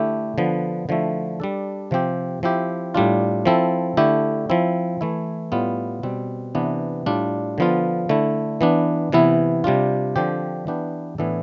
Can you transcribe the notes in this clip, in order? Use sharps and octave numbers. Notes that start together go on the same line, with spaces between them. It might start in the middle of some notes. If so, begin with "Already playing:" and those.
Already playing: D3 A3 E4 G4
D3 F3 B3
D3 F3 A3 E4
G3 D4 A4
C3 F3 C4 G4
F3 C4 E4 G4
A2 G3 D4 F4
F3 C4 E4 A4
D3 A3 E4 G4
F3 C4 E4
E3 A3 E4
A2 G3 B3 F4
B2 G3 C4
C3 E3 B3 D4
A2 G3 D4 F4
D3 F3 B3 F4
D3 A3 E4
E3 B3 D4
C3 E3 B3 E4
C3 G3 D4 F4
D3 F3 C4 G4
E3 B3 D4 G4
A2 E3 B3 D4 A4